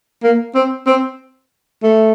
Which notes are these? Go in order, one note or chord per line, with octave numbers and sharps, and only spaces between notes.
A#3
C4
C4
A3